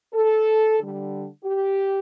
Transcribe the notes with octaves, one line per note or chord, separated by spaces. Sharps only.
A4
D3 G3
G4